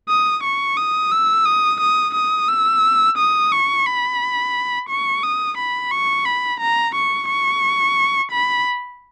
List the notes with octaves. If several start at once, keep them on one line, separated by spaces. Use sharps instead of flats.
D#6
C#6
D#6
E6
D#6
D#6
D#6
E6
D#6
C#6
B5
C#6
D#6
B5
C#6
B5
A#5
C#6
C#6
B5